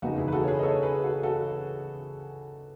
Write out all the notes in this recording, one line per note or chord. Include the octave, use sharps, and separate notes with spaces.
F#1 E2 B2 G#3 B3 D#4 F#4
E4 G#4
B4
F#4 A4
C#5
G#4 B4
D#5
A4 C#5
G#4 B4
F#4 A4
F#4 A4